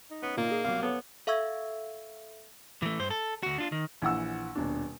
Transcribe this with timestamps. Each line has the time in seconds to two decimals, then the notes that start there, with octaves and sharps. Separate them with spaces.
0.11 D#4
0.22 B3 C#4
0.37 A#2 A#3 F4
0.51 G#4
0.65 C2 B2 F#3 F5 D6
0.82 B3 A4 C#5 F5
1.27 A4 E5 F5 C#6 E6 G#6
2.82 E3 A3
2.99 G2 C5
3.10 A4
3.43 D2 F#4
3.58 D4 F4
3.72 D#3
4.02 A#1 E3 F#5 E6
4.55 D#1 B2 D4